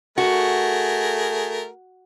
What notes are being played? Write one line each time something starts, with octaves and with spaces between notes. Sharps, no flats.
A3 F#4 G#4 A#4